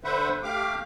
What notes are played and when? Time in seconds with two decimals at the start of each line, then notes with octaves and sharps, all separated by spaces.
0.04 D3 B4 C5 E5 F#5
0.43 A3 G4 F5 D6